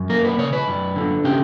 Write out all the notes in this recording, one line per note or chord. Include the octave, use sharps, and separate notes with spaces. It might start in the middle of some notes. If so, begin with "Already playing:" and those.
Already playing: F#2
A#3 A#4
B4
C#3 C#5
B4
F#2
D3
C#3 G4